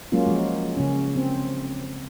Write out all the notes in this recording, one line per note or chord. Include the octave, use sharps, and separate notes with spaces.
F#3 G#3 A#3 C#4 F4
F3 G#3
C#3 C#4
C4